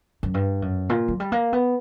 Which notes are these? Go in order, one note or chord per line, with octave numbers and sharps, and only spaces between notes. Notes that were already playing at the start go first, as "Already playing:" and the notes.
F#2
G2
F#2
A#2
F#3
G3
A#3
B3